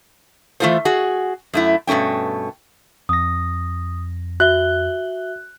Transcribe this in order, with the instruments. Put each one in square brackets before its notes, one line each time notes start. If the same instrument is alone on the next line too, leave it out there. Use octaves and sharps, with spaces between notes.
[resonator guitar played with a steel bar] E3 A3 D#4 F4 A4 C5
F#4 G#4
F#2 A3 E4
G2 B2 A3 C#4 G5
[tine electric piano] F2 A#6 [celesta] D#6
[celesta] F#4 E5 G7 [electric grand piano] F#6